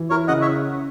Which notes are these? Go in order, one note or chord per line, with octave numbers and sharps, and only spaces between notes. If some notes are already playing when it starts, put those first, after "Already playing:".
Already playing: E3
E4 A#4 C#5
C#3 D#5 F#5
C#5 E5